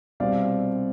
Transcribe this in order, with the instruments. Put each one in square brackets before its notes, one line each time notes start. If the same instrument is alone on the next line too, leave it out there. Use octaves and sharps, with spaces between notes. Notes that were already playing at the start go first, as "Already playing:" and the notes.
[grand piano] C2 B2 G3 C4 D5 F5